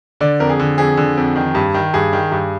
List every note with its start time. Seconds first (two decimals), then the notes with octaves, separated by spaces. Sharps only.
0.21 D3 D5
0.40 F2 A#4
0.49 G#4
0.60 D3
0.78 F2 G#4
0.97 D3
1.17 F2
1.36 D#3
1.55 G2
1.74 D#3
1.94 G2 G#4
2.13 D#3
2.31 G2